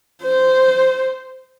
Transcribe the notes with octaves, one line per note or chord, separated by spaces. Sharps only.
C5